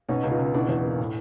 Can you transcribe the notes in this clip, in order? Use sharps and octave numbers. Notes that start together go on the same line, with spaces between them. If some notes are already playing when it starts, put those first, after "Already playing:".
B2 C#4 D#4
C#2
D#4 F4
C#2
B2 D4 E4
E2
A#3
A2